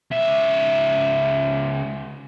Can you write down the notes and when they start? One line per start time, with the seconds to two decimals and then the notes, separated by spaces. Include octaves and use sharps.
0.11 C#2 E5